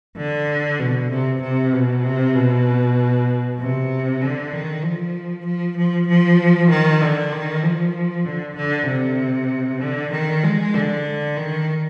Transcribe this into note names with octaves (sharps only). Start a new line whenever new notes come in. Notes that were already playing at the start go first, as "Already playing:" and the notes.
D3
B2
C3
C3
B2
C3
B2
C3
D3
D#3
F3
F3
F3
F3
D#3
D3
D#3
F3
D3
D3
C3
D3
D#3
G#3
D3
D#3